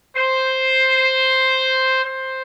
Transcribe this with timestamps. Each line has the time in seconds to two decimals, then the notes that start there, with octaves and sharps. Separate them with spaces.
0.16 C5
2.04 C5